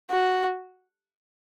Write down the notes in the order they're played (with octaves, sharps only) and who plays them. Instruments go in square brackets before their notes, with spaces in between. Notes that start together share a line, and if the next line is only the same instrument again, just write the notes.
[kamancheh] F#4